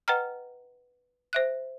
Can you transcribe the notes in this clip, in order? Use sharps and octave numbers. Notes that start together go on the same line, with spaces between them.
B4 D#5 F#5 G5 A#5 F6
C5 E5 F#6